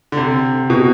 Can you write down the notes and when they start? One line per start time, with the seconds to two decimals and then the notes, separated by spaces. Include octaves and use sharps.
0.12 D3
0.17 C3
0.70 B2